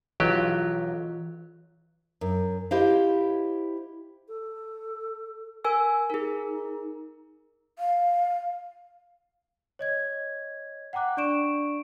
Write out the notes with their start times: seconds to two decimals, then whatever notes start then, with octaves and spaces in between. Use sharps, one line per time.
0.20 B1 E3 F#3 F4 G4
2.21 F#2
2.71 E4 G4 C5 D#5 F5
4.28 A4
5.64 A#4 G#5 E6
6.10 D#4 G#4 A#4
7.79 F5
9.79 C#5 D#5 G#6
10.93 F#5 G5 A#5 D6 F#6
11.17 D4 D5 C#6 D7 E7